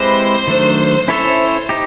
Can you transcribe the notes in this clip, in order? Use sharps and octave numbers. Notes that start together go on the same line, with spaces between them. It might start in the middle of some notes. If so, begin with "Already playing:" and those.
Already playing: G#3 C4 E4 G4 B4 C5
D#3 F#3 A3 D4
C#4 E4 A4 C5 C#5 E5
D#4 G4